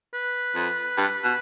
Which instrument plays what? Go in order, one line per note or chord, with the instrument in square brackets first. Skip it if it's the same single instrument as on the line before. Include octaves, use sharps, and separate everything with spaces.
[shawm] B4
[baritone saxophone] F2
G2
B2